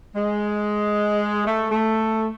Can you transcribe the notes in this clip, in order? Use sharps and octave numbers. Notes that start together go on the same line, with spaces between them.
G#3
A3
A3